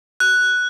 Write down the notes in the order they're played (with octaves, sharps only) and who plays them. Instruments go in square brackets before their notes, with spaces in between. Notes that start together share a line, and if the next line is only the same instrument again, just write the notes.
[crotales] F#6